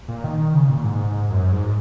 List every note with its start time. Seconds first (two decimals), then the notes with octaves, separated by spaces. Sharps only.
0.08 A#2
0.24 D#3
0.39 D#3
0.54 C#3
0.69 A#2
0.79 A#2
0.84 G#2
1.30 F#2
1.52 G#2